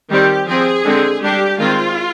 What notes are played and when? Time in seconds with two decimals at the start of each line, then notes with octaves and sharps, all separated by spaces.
0.09 D#3 G3 C4 G4
0.46 F3 C4 G#4
0.84 D3 G#3 C4
1.22 G3 D4 G4
1.58 D#3 G#3 C4 F4